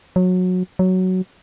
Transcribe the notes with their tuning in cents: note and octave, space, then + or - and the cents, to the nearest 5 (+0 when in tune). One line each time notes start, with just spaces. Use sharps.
F#3 -20
F#3 +5